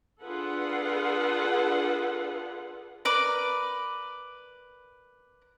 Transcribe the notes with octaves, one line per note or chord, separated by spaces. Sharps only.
D4 F4 G#4 A4 B4 F#5
A#4 B4 D5 D6